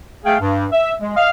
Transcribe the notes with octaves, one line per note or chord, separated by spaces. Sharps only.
A3 G#4 F5 G5
G2
E5
G#3
D#5 F5